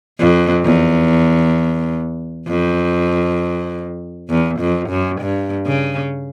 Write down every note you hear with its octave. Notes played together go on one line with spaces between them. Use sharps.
F2
E2
F2
E2
F2
F#2
G2
C#3